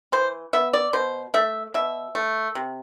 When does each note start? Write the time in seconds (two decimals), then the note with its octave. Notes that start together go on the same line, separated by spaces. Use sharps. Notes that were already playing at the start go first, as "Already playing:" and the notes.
0.12 E3 C5
0.53 B3 E5
0.73 D5
0.93 B2 C5
1.34 A3 E5
1.74 B2 E5
2.15 A3
2.55 C3